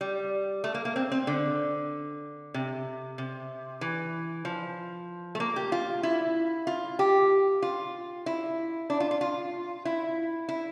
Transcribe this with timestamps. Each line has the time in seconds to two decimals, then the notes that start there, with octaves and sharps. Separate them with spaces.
0.01 G3
0.64 A3
0.75 A#3
0.85 A#3
0.96 C4
1.12 C4
1.27 D3
2.54 C3
3.18 C3
3.81 E3
4.45 F3
5.35 A3
5.40 A#3
5.56 G4
5.72 F4
6.03 E4
6.67 F4
6.99 G4
7.62 F4
8.26 E4
8.90 D4
9.00 F4
9.11 F4
9.21 F4
9.85 E4
10.49 E4